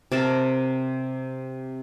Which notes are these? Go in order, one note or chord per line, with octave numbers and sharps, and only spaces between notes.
C3 A#4 A5